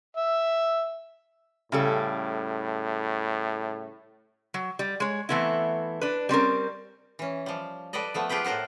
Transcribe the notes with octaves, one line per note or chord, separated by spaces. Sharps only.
E5
A2 C#3 G3 A4
F#3
G3
G#3 C#5
E3 A3 B3 C4 E4
D4 B4
G3 C4 C#4 A#4
E3 C#4
F3 G3
G3 A4 B4 D5 D#5
F3 A3 B3
F4 G4 G#4 B4 G5
A2 A4 A#4 C5 F#5